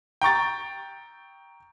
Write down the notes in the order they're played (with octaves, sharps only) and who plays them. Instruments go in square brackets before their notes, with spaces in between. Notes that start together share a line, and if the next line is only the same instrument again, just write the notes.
[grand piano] G5 A#5 C#6 A6